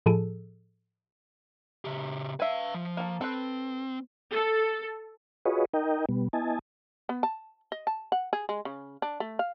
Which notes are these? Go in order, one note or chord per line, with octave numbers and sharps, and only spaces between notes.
A2 F3 G#4 A4
C#3 G4
B4 E5 F5 G#5
F3
A#3 A4
C4 A4 B4
A4
F4 F#4 G#4 B4 C#5 D#5
D#4 A#4 D#5 G5
B2 G3 B3
B3 E4 D#5 G#5 A5
B3
A5
D#5
A5
F#5
G#4
G#3
C#3
D4
A3
F5